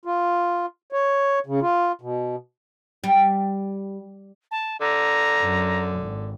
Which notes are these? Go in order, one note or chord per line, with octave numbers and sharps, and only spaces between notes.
F4
C#5
C#3
F4
B2
G3
A5
D3 A#5
F#2
G#1